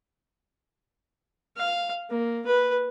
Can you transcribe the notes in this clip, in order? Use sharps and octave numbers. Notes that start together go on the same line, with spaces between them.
F5
A#3
B4